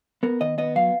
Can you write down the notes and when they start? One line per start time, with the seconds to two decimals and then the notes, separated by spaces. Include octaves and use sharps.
0.23 B3 A#4
0.41 D#3 D#5
0.58 B3 D#5
0.76 F#3 F5